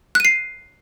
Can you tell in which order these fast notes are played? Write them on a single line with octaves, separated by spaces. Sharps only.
F#6 D#7 C7